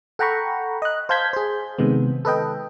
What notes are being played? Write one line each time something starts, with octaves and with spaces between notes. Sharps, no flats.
A4 F#5 G5 A#5 B5 C#6
D#5 F#6
C5 F5 A5 G6 G#6 B6
G#4 C5
C3 D#3 G#3 B3
A4 B4 D#5 G5